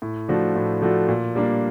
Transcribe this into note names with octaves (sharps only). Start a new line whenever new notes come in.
A2
F3 A3 D4 F#4
A2
F3 A3 D4 F#4
A#2
G3 A#3 D4